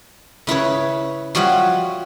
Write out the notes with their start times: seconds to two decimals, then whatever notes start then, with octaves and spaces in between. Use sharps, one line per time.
0.47 C#3 E4 B4 C#5
1.35 F3 G3 F#4 C#5 E5 F#5